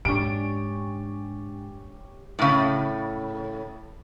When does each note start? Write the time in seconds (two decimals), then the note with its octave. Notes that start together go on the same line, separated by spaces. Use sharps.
0.05 G#2 D4 G4 C#5 G#5 D7
2.39 A2 C#3